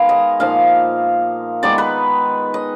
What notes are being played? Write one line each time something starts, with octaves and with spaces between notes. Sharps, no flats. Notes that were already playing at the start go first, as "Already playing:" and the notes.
Already playing: D#3 G#3 B3 F5 G#5
D#5
A#2 F3 A#3 D#4 F5
D#3 G#3 B3 D#4 D5
B4
D#5